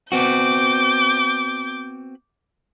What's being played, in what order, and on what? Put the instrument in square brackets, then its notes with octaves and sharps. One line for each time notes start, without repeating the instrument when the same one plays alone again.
[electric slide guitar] B3 C4 F#4 [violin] D6 G6